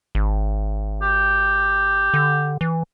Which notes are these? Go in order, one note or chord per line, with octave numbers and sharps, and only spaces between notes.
G#1
G4
D3
E3